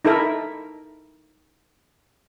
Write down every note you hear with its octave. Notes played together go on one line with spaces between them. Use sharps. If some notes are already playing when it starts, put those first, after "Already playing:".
D#4 E4 A4 A#4 E5